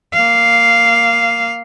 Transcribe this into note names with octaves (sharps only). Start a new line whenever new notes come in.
A#3 F5